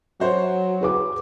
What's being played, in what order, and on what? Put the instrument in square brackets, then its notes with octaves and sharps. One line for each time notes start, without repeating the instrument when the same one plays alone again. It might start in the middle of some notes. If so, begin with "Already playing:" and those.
[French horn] F#3 [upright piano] F#4 C5 C#5
[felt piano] G#4 B4 D6